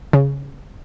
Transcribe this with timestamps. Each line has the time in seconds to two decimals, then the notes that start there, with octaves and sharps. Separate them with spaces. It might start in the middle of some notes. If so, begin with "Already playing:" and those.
0.13 C#3